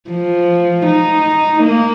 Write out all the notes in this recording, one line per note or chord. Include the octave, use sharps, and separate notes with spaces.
F3
D#4
A#3